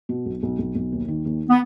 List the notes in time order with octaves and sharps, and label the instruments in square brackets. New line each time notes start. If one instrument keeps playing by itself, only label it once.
[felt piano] B2
B1
B1
B1
B1
D#2
D#3
D#2
[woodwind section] B3